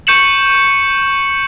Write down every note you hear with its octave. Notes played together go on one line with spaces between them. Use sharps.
C#6 G6 C#7 E7 F#7